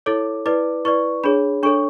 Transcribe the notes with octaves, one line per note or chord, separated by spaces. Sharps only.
E4 A4 C#5 D6
E4 B4 D5 D6
E4 B4 D5 C#6
D4 G#4 C#5 B5
D4 A4 C#5 C#6